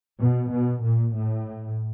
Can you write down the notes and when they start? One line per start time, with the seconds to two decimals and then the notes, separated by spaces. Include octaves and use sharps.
0.19 B2
0.51 B2
0.82 A#2
1.14 A2